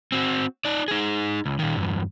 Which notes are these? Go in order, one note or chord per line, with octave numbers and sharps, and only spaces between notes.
C4 F#4
D#4 D5
D#4 G#4
C#2
A#2 D#3
E2 G2